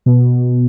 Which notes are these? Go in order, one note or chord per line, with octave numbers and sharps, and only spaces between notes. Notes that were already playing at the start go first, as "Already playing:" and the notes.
B2